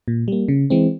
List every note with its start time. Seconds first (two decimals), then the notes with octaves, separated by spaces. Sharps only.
0.08 A#2
0.28 G3 A#3
0.48 C#3
0.70 E3 G#3 C4